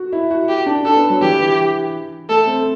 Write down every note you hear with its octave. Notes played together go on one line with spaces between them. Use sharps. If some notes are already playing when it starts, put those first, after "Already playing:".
Already playing: F#4
E4
F#4
F#4 G4
D4
D4 A4
B3
F#3
E3 G4
E3
A3 A4
C4